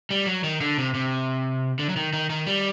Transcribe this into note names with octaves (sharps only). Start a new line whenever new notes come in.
G3
F#3
D#3
D3
C3
C3
D3
F#3
D#3
D#3
D#3
G3